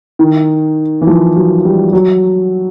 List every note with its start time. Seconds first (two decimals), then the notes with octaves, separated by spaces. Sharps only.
0.19 D#3
1.01 E3
1.07 F3
1.36 F#3
1.64 G3
1.93 F#3